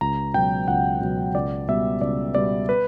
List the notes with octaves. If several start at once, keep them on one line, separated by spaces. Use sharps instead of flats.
C#2 A#5
B2 F#3 G5
C#2 F#5
B2 F#3
C#2 D5
B2 G3 B3 E5
C#2 D5
B2 G3 B3 D5
B4